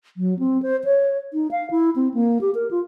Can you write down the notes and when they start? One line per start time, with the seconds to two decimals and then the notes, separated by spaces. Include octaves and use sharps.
0.17 F#3
0.39 C4
0.62 C5
0.85 C#5
1.33 D#4
1.51 F5
1.71 E4
1.96 C4
2.14 A#3
2.41 G4
2.55 A#4
2.71 F4